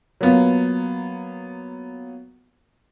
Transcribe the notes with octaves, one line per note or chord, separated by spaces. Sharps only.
F#3 A#3 B3 F4